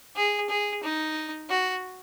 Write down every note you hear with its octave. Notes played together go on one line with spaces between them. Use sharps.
G#4
G#4
D#4
F#4